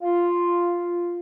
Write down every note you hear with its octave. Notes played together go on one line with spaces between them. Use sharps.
F4